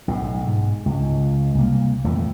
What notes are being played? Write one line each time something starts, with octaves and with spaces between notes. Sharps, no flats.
B1 A2
G#2
C#2
C2 A#3
D#1 F2 E3 A3